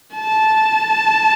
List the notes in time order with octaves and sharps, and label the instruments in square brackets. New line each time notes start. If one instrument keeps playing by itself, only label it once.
[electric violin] A5